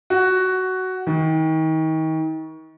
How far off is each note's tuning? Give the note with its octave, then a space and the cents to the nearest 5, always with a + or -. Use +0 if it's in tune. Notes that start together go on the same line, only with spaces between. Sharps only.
F#4 +10
D#3 +35